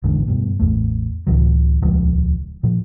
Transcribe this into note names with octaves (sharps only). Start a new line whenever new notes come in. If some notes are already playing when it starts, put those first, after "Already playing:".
A1 E2 G#2 D3
G2 B2
A1 E2 A3
C#2 A2 E3 F#3
D#1 C#2 F3 G#3
A#2 F3